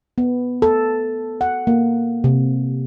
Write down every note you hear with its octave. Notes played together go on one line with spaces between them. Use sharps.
B3
A4
F#5
A#3
C3